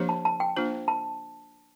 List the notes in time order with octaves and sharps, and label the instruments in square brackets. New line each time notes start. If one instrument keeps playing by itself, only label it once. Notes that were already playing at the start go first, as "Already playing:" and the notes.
Already playing: [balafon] F3 A#3 D4 G4 C5
[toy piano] A5
A5
G5
[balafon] A#3 D4 F4 C5
[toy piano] A5